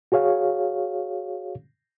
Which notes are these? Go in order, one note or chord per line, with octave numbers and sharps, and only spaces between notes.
F#4 G#4 C#5 F5